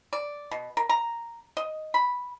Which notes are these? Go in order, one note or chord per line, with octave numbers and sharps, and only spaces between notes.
D5
B2
A#4
A#5
D#5
B5